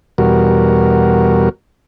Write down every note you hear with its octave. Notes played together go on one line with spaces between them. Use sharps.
E2 B2 G3 F#4 A#4